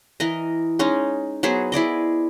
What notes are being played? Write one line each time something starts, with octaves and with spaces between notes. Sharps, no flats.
E3 A#4 D#5
G#3 C#4 D#4
F#3 B3 G#4 C5
E4 G#4 D5 D#5